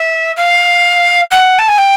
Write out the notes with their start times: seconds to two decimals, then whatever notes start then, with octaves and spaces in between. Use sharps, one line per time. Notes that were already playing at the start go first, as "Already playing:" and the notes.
Already playing: E5
0.36 F5
1.31 F#5
1.58 A5
1.68 G#5
1.78 G5